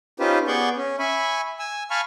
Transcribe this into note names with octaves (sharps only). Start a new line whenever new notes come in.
C#4 D#4 F4 G4 B4 C5
B3 G#4 D5 F#5 C#6 G6
C#4
E5 G#5 B5 C#6
G#5 E6
F5 G#5 A5 B5 C#6 F6